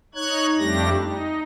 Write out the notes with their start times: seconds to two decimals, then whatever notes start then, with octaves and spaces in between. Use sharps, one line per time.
0.15 D#4 C#5 F#6 G#6
0.59 F2 G3 A3 D4 G4 A#6
1.02 D#4